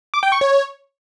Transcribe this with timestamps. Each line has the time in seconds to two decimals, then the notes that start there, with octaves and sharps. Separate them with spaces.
0.14 D6
0.23 G5
0.32 C#6
0.41 C#5